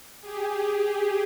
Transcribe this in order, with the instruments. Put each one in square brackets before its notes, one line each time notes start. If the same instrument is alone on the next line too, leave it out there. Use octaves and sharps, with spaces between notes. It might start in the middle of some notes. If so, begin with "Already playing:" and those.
[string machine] G4 G#4